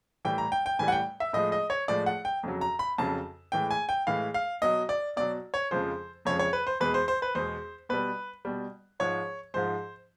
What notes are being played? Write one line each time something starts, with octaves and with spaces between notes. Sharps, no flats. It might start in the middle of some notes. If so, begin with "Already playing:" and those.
A2 E3 G3 G5
A#5
G5
G5
A2 E3 G3 G#5
F#5
G5
E5
A2 F3 G#3 D#5
D#5
C#5
A2 F3 G#3 D5
F#5
G5
F2 C#3 F#3
A#5
B5
F2 C#3 F#3 A5
A2 E3 G#3 G5
G#5
G5
A2 E3 G#3 F5
F5
B2 F#3 D#5
D5
B2 F#3 D5
C#5
F2 C#3 F3 G#3 C5
F2 C#3 F3 G#3 C#5
C#5
B4
C5
E2 B2 G#3 B4
C5
C5
B4
E2 B2 G#3 C5
B2 G3 B4
B2 G3
G#2 F3 G#3 C#5
G#2 F3 G#3 C5